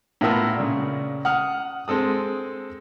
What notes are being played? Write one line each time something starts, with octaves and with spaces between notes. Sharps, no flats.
A2 B3 F4 A#4 E6
A#2 C#3
F#5 D#6 F6
G#3 C4 A4 D#6